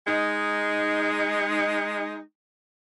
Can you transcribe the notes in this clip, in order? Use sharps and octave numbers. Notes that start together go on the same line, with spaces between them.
G#3 D#4